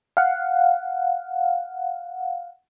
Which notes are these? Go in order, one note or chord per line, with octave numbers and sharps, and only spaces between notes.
F5 F#5